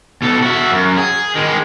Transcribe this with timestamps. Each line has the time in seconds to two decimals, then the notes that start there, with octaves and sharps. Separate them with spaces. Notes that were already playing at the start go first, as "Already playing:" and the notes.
0.22 B2 A4
0.42 F#4 E5
0.72 F#2
0.97 G#4
1.36 D#3 G#3